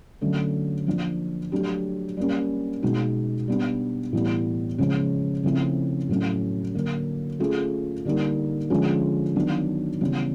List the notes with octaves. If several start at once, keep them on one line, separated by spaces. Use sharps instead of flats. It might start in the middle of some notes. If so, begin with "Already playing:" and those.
D3 F#3 A3 C#4
F3 A#3 D4
F#3 A3 D4 G4
G3 A#3 C#4
B2 G#3 B3 D#4 F#4
G3 B3 D4
A2 E3 G3 B3
C#3 F3 G#3 C#4
C#3 F3 A3 C4 E4
A2 F#3 A3 C#4
D3 F#3 A#3
A3 C#4 F4 G#4
D3 G3 A#3 D#4
D3 F3 G#3 C#4 F4
D#3 F#3 B3 D4
C#3 E3 G3 B3